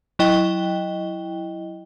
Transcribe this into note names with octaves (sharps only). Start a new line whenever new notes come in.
F#3 E4 D#5 G5 G7